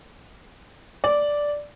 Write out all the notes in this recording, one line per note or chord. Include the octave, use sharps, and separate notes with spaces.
D5